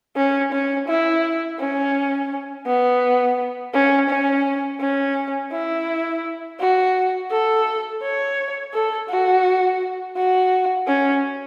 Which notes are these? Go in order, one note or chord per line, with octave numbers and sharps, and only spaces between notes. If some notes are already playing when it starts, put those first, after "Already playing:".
C#4
C#4
E4
C#4
B3
C#4
C#4
C#4
E4
F#4
A4
C#5
A4
F#4
F#4
C#4